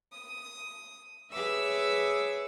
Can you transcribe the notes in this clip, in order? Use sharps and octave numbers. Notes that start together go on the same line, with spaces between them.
D#6
G#4 B4 C#5 E5 D6 E6